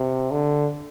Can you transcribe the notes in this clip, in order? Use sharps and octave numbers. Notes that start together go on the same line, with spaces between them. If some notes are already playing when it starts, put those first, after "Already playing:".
Already playing: C3
D3